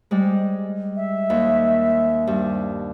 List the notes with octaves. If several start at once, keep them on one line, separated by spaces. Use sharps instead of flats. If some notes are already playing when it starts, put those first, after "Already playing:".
G3 G#3
E5
D#2
G2